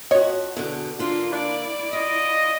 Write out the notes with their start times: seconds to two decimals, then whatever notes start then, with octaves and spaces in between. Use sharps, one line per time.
0.11 F2 F#4 C#5 D#5
0.57 E2 B2 D3
0.99 D3 A#3 D4 F4
1.33 D4 E4 D5
1.93 F4 D#5